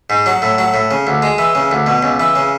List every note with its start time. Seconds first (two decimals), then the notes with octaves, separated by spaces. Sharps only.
0.10 G#2
0.26 F#3
0.42 A2
0.58 F#3
0.74 A2
0.91 C#3
1.07 D2
1.22 G#3
1.38 E3
1.55 C#3
1.71 D2
1.86 B2
2.03 C#2
2.20 E3
2.36 C#3